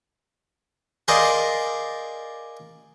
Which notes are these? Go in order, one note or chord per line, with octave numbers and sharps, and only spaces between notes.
G#4 A#4 C5 D5 D#5 F5